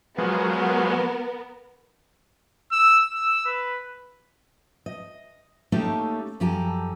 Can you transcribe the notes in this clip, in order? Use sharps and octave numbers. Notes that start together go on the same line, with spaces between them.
F3 F#3 G#3 B3 A#4
E6
E6
B4
D#5
A3 A#3 C#4 D#4 G4 A4
F#2 F3 G4 A4 G#5 A#5